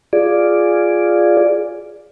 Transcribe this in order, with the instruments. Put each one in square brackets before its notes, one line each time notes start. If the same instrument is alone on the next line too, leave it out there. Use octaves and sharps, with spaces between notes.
[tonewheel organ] F4 G#4 D5